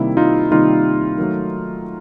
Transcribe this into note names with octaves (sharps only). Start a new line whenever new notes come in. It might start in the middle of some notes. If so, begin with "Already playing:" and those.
Already playing: C3 D#3 G3 A#3 E4
D#4 F4
C3 D#3 G3 A#3 D#4 F4
D#3 F#3 A3